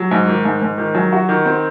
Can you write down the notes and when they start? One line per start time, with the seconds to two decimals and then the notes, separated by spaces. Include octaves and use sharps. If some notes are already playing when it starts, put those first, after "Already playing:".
Already playing: F#3
0.11 G#2
0.28 D#3
0.45 G#2
0.62 G#2
0.78 D#3
0.95 F#3
1.13 F#4
1.29 D#3
1.45 C4